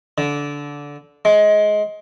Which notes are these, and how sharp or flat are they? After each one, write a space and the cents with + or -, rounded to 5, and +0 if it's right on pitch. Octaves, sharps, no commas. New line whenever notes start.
D3 -20
G#3 +20